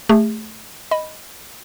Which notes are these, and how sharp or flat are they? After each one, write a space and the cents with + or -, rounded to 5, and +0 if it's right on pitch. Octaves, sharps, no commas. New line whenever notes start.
A3 -5 G#4 -40
D#5 +0 B5 +0